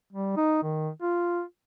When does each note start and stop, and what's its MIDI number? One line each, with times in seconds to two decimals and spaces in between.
0.13 0.34 55
0.37 0.61 63
0.63 0.89 51
1.02 1.42 65